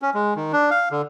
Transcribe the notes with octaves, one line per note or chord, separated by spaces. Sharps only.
C#4
G#3
D#3
D4
F5
D3